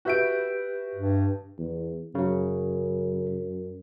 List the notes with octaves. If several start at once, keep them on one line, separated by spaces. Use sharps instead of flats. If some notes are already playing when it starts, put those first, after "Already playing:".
F#4 G4 B4 E5 G6 D7
G2
E2
F#2 C#3 F#3